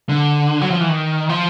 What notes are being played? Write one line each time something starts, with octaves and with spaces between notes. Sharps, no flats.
D3
F#3
F3
E3
D#3
F3